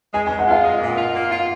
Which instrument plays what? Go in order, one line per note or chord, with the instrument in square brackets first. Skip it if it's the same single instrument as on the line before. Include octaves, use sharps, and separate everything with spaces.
[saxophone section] G#3 [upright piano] G#5
[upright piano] G#5
[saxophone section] G#3
[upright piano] F#5
[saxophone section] F4 [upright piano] F5
[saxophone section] G#3
A#2
F4
A#3
F4